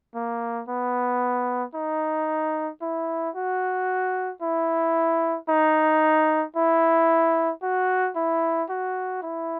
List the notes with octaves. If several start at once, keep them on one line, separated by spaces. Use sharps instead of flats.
A#3
B3
D#4
E4
F#4
E4
D#4
E4
F#4
E4
F#4
E4